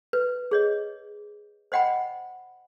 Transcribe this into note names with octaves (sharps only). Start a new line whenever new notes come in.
B4
G#4 C#5 D#5
C5 D#5 F#5 G5 B5